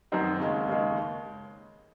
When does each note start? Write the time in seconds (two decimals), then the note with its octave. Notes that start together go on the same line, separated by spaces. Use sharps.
0.12 F#2 D#3 F#3 C4 D#4
0.40 D#2 C#3 G#3
0.67 D#2 C#3 G#3